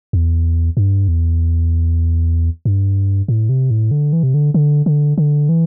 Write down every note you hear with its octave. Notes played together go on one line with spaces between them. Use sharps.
E2
G2
E2
G2
A2
C3
A2
D3
E3
C3
D3
D3
D3
D3
E3